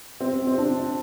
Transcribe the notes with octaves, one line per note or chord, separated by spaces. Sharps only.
C4
C4
D4